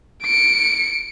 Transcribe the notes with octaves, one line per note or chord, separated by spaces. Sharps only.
C#7 D7